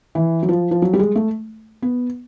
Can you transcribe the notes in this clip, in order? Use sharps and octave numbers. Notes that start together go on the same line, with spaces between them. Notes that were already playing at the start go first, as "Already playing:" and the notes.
E3
F#3
F3
F3
F#3
G3
G#3
A3
B3